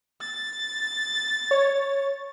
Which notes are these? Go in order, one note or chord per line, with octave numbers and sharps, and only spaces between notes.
A6
C#5